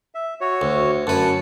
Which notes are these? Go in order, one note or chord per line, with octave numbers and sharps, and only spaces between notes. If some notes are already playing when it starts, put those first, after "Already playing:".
E5
F#4 C#5
D2
F#2 B4 F#5 A5